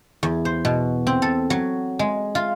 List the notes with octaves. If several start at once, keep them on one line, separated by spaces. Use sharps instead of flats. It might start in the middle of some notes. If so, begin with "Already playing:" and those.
E2
C5
B2
C4
A4
F#3
G#3
F4